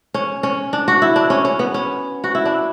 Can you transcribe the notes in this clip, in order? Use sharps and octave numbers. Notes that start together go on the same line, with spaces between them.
C#4
C#4
D4
F#4
E4
D4
C#4
C#4
B3
C#4
F#4
E4
D4